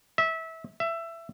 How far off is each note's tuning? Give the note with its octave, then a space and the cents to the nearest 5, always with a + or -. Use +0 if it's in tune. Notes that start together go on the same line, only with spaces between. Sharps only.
E5 -25
E5 +15